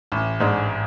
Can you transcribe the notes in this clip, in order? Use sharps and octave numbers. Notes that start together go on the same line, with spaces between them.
A1
G#2 G#3 D4